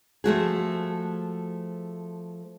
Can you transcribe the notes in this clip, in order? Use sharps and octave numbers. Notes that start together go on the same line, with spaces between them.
F3 A3 F#4 G#4